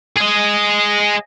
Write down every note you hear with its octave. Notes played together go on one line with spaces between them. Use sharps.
G#4 D#5